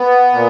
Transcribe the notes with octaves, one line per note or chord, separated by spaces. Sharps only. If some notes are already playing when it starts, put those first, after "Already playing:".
Already playing: B3
A#2